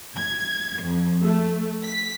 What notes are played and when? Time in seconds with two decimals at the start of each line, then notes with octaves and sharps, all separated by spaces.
0.16 G#6
0.82 F2
1.23 A3
1.82 B6